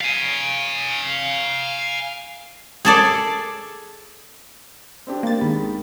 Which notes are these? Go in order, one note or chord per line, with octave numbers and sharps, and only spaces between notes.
F5 G#5
G#4 A4 D5
C4 D4 G4
A#3 A6
G#1 G#2 D#3 B5